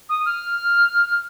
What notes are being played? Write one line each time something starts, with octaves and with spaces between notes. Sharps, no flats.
D#6
F6